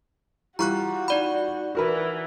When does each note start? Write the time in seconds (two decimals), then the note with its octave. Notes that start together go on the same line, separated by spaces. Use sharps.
0.59 E3 G3 F4 F#4 A#5 C#6 F#6
1.08 D#4 D5 B5
1.75 E3 F#4 A#4 B4